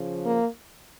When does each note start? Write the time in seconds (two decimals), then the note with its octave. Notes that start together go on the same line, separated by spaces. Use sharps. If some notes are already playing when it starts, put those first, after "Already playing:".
Already playing: C#3 F3
0.24 A#3